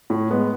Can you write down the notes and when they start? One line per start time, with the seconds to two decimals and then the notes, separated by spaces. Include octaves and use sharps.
0.10 A2
0.31 G#3 B3